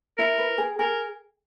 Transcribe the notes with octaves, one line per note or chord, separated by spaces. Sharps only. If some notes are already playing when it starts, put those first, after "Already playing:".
E4 A#4
B4
G#4
G#4 A#4